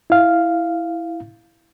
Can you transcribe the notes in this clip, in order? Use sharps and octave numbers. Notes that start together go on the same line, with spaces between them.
E4 F5